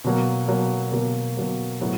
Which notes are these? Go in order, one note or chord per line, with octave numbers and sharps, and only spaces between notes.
B2 F#3 A#3
B2 F#3 A#3
B2 F#3 A#3
B2 F#3 A#3
A2 F#3 B3